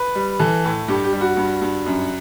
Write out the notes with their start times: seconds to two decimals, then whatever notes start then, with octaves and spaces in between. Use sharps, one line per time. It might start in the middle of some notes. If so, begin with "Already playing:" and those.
Already playing: B4
0.15 G3
0.40 E3 A4
0.65 A2
0.88 G2 G4
1.04 G4
1.13 G3
1.21 F#4
1.37 G2
1.61 G2
1.86 F#2